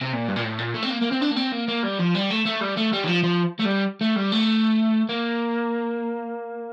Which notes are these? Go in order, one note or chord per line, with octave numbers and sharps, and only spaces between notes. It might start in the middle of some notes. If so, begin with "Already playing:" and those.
C3
A#2
G2
A#2
A2
A#2
A3
C4
A#3
A#3
C4
D4
A#3
C4
A#3
A#3
G3
F3
G3
A3
A3
G3
A3
G3
D#3
F3
F3
A3
G3
A3
G3
A3
A#3